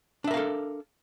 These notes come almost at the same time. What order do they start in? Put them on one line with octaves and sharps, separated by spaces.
D4 E5 A#4 F5 A4